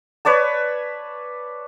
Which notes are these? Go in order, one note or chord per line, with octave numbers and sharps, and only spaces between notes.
B4 C#5 D5 A5